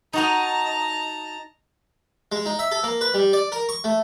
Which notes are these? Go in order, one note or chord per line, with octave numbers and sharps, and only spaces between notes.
D#4 F#4 D#5 A5 A#5
G#3
D#4
E5
A4
A#3
B4
G3
D5
A#4
C#6
A3